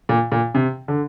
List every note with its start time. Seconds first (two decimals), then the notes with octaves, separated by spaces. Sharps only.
0.09 A#2
0.32 A#2
0.55 C3
0.88 D3